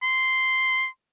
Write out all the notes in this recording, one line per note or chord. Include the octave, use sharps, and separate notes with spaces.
C6